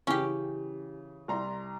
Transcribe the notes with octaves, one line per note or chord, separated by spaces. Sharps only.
C#3 E3 C#4 G4
C2 A#5 C6